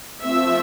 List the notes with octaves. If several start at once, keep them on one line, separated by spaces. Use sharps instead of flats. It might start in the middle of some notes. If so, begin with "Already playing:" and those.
F3 A3 C4 E5